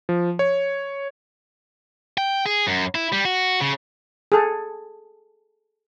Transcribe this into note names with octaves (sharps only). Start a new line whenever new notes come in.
F3
C#5
G5
G#4
F#2
E4
G3
F#4
C#3
G#4 A4